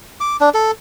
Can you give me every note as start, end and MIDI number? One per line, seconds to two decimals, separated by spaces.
0.21 0.37 86
0.40 0.49 62
0.54 0.71 69